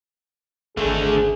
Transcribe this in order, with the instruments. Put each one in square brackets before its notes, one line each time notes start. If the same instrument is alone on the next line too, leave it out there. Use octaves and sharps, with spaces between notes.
[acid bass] G#1 [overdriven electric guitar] D3 A3 [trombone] G#4